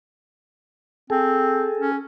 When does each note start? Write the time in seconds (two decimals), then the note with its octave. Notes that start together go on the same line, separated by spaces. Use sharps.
1.10 C4 G#4 A4
1.79 C#4